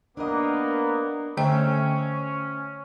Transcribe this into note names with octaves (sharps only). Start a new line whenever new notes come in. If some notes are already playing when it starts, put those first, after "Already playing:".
A#3 B3 D4 A#4 D#5
D3 A3 C#4 C5 E5 G5